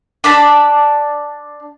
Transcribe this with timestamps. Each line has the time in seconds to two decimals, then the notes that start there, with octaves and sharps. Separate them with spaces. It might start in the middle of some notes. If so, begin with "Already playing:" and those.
0.24 D4 D5 A5 B5